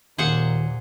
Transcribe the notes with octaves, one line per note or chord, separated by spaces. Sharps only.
D#2 A#2 A#3 G#4 C5 F#5